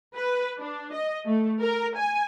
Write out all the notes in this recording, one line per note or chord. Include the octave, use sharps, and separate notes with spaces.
B4
D4
D#5
A3
A#4
G#5